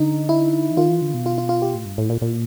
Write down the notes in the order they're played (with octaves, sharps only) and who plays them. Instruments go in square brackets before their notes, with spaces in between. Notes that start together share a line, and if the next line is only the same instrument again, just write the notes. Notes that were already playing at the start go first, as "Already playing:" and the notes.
Already playing: [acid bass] D3 [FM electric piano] D#4
[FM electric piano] E4
[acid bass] E3
[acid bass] D#3 [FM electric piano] F4
[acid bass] E3
D3
B2
[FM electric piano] F4
F4
F4
G4
[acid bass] A2
G2
A2
A#2
A#2